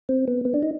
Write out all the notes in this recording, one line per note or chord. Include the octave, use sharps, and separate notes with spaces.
C4
B3
B3
D4
D#4